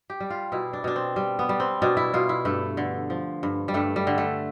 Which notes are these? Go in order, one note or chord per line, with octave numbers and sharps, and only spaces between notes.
G4
G3
F4
B2 E4
D4
B2 D4
C4
G3
B3
G3
C4
B2 D4
E4
B2 F4
E4
G2 A3
D3
F3
G2
G3
G2 A3
G3
D3
A3